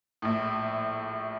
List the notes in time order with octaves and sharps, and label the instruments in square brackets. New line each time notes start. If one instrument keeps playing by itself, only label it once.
[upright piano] A#1 A2